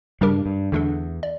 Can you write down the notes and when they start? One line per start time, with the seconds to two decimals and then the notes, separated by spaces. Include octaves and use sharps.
0.21 G2 C#3 G3 D4 G4 A#4
0.46 G2
0.72 E2 D3 A3 D4 A4
1.23 D5